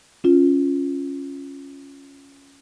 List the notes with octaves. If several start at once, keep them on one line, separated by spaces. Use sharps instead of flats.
C#4 F4